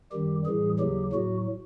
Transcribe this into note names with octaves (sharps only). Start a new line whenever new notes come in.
F#2 D#3 G3 G4
A2 E3 G3 G#4
D#2 C#3 F#3 G4
A2 F#3 F#4